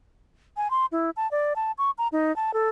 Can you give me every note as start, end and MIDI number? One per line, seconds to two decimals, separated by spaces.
0.57 0.70 80
0.71 0.86 84
0.92 1.10 64
1.17 1.30 81
1.31 1.53 74
1.56 1.72 81
1.78 1.91 85
1.98 2.08 82
2.12 2.35 63
2.36 2.54 81
2.54 2.69 69